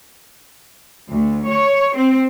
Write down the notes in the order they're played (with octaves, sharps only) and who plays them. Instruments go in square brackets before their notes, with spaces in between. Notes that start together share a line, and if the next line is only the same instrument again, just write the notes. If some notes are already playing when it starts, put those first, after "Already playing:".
[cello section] D2
C#5
C4